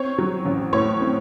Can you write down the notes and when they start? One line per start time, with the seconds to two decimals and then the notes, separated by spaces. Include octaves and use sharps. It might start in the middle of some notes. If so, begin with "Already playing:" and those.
Already playing: C4 C#5
0.18 F#3
0.45 A1
0.73 A2 C#5
1.01 C4